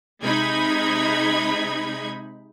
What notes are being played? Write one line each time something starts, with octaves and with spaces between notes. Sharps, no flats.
C3 G#3 D#4 B5 G#6